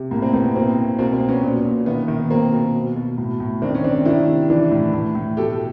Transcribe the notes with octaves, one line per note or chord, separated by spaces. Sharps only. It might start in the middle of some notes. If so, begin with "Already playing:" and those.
Already playing: C3
A2 A#3
A#3 C4
A2 B3
B3
B2 A#3 C4
B2
B2 A#3 C4
A#3 C4
B2
B3 C#4
A#2
A#2
D#3 B3
D#3
B2 A#3 C4
B2
B2
B2
A2
A2
D#3 C4 D4
C#4
D#3 C4 D4
D#3 D4 E4
C3
E3 D4 E4
A2
A2
A2
B2 G4 A4